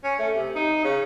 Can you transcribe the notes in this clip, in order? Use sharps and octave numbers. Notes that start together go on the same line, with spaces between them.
C#4
A3
C3
D#4
C#3